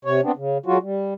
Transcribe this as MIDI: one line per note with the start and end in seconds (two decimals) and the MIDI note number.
0.05 0.21 48
0.05 0.21 73
0.23 0.32 59
0.23 0.32 60
0.23 0.32 62
0.36 0.58 49
0.66 0.78 54
0.66 0.78 56
0.66 0.78 65
0.66 0.78 66
0.82 1.14 55